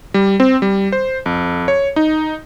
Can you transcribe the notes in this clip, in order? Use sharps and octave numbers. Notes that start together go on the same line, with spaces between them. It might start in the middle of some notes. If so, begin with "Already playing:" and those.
G3
C4
G3
C5
F2
C#5
D#4